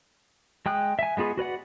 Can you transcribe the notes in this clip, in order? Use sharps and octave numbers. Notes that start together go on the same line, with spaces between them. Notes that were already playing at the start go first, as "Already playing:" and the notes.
G#3 G5 D#6 F#6
E5 G#5
G#3 B3 F4 G#4
F#4 B4 D5 F#5